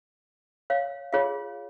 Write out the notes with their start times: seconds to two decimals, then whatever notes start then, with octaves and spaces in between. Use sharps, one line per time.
0.70 C#5 F5
1.13 F4 G#4 C#5 F5